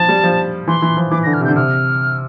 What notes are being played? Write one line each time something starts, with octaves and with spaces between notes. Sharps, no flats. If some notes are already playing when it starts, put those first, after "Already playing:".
Already playing: F3 A5
G3
F3
E3 C6
E3
F3
E3 D6
D3 A#6
F6
C3
G6
D3
C3 F6